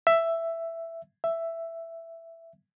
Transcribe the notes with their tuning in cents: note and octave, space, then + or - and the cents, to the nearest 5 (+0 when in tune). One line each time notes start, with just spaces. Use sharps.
E5 +10
E5 +10